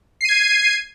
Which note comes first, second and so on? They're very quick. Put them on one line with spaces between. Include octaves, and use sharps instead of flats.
C7 D#7 G#6